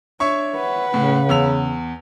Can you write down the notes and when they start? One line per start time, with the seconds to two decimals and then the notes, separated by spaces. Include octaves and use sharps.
0.20 D4 C#5 E5 C#6
0.56 B4 F#5
0.94 A2 C#3
1.29 E2 E6 F7